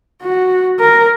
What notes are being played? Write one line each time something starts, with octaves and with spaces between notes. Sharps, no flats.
F#4
A#4